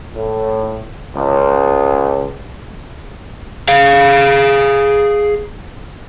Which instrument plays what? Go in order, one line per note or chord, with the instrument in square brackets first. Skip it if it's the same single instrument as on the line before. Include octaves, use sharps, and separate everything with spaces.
[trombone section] A2
C#2
[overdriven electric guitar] G#4 F5